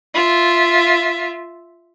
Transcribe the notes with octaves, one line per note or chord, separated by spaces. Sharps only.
F4 E5